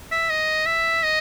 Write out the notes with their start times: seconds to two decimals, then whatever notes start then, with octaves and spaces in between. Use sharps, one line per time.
0.12 E5
0.30 D#5
0.66 E5
1.04 D#5